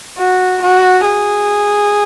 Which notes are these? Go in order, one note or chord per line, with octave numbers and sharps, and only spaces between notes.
F#4
F#4
G#4